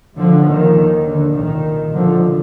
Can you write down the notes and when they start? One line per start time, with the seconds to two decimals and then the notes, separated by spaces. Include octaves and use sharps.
0.18 D#2 D3 F3
0.47 D#3
1.06 D3
1.35 C2 A#2 D#3
1.93 D3 F3